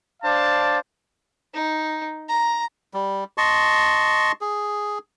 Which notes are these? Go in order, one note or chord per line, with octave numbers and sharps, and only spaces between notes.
D4 C5 D5 F5 A5
D#4
A#5
G3
D#5 A5 C6 C#6
G#4